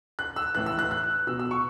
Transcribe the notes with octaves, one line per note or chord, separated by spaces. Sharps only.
F#6
E6
A2 E3 F#6
E6
F#6
F#6
B2 E6
E6
C#6